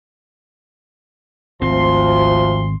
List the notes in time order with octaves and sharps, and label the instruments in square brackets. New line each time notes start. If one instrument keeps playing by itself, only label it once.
[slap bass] G#1 C4 [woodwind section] D2 C6 [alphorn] F3